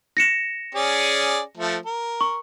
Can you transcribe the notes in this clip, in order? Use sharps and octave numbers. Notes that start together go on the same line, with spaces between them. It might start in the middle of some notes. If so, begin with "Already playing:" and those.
A#6 C#7 E7
C#4 G#4 D5
F3 A3
A#4
C#6